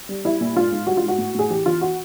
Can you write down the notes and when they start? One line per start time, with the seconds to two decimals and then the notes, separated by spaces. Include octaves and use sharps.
0.09 G3
0.24 G3 E4
0.41 A#2
0.56 G#2 F4
0.72 G#2
0.87 G3 F#4
0.97 F4
1.03 G#2
1.08 F#4
1.18 A2
1.35 A2 G#4
1.50 E3 G4
1.66 E3 F4
1.81 F#4